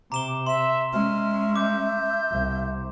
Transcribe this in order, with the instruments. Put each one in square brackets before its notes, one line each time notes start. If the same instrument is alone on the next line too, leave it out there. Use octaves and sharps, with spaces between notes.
[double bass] C3 [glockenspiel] A#5 E7 G7 [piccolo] D6
[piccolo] E5 [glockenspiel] C6 E7
[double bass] G#3 C#4 [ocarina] E5 [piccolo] F6
[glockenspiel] D6 [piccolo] G6
[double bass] C2